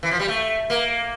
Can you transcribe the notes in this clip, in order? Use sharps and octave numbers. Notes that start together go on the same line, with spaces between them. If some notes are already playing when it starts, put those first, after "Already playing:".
E3
F3
G3
A3
A#3